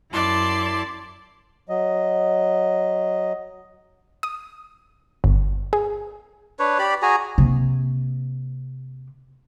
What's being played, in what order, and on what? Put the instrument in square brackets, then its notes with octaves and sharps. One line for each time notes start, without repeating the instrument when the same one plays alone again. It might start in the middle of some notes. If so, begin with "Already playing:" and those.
[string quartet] F#2 E4 D5 A5 C6
[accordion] F#3 D#5
[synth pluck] D#6
G1
G#4
[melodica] D4 B4 C#5
G4 D5 B5
F#4 G#4 G#5 A#5
[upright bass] C3 A#3